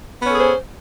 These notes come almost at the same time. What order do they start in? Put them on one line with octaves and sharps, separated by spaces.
B3 C#4 A4 G#4 C5